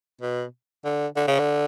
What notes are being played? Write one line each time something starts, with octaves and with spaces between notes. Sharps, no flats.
B2
D3
D3
C#3
D3